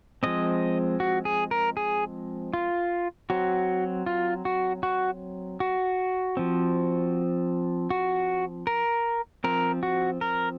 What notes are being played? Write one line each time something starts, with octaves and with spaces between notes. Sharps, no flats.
F3 G#3 C4 D#5
F#4
G#4
A#4
G#4
F4
F#3 C4 F#4
F4
F#4
F#4
F#4
F3 C4
F#4
A#4
F3 C4 A#4
F#4
A#4